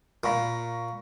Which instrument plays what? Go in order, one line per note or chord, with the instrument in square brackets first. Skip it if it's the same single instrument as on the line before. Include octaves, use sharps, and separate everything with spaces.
[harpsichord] A#2 [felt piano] B5 C#6 A#6